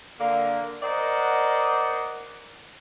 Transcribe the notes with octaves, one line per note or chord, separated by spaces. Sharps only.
D3 A#3
A#4 C5 D5 D#5 F#5